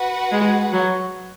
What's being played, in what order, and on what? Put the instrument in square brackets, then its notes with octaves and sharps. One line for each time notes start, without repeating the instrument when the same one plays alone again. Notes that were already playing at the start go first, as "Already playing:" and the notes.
Already playing: [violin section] F#4 B4 F#5
[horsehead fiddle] G#3
F#3